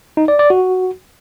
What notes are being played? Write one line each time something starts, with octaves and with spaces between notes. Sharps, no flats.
D#4
D5
D5
F#4